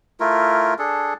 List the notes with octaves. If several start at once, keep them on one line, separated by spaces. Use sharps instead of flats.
A3 E4 F4 A#4
D4 G#4 A4